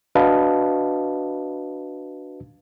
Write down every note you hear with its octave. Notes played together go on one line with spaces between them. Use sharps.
D4 F#4 B4 D#5 F5 A5